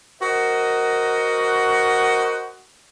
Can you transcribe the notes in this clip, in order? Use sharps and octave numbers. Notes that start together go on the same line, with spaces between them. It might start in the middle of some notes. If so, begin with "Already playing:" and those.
F#4 A#4 C5 D#5 F#5